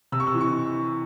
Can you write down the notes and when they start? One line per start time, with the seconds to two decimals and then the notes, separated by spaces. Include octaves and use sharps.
0.12 C3 E6
0.20 C#6
0.27 E6
0.34 E3
0.41 C#6